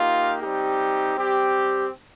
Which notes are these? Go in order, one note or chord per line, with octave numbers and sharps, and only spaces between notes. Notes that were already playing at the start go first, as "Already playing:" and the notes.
Already playing: A#3 D#4 F4 G4 F5
G3 C4 D#4 G4
G3 C4 G4